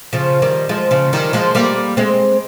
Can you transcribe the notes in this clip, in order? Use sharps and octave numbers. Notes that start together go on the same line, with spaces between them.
C#3 F3
D#3 G3
F3 G#3
C#3 F3
D#3 G3
F3 G#3
G3 A#3
G#3 C4